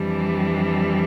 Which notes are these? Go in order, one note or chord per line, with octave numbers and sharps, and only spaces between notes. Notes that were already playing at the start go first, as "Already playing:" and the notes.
Already playing: F2 E3 G3 D4